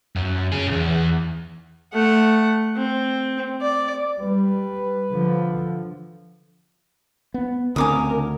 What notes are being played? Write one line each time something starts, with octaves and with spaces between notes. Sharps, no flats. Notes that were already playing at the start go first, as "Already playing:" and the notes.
F#2
C#4 G#4
B1 E2
A3 F#5
C4
D5
G3 B4
D3 F3
B3
D2 C#3 C4 D4 A#4 G#5 D6 D#6